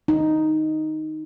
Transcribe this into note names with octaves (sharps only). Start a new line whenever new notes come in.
D#4